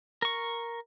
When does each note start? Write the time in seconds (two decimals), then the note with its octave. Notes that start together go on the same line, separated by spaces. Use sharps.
0.22 A#4 C#6